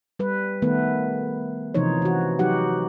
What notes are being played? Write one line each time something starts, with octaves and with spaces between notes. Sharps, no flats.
G3 B4
D#3 A3 B3 B4
C3 E3 F3 D#4 C5 C#5
E3 F#4
F#3 D#4 F#4 G4 F#5